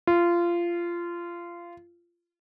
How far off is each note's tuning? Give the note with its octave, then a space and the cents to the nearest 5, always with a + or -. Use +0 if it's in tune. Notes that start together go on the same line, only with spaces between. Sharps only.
F4 -20